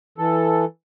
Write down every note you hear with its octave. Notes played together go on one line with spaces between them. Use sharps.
E3 A4